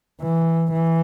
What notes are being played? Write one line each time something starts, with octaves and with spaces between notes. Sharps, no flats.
E3
E3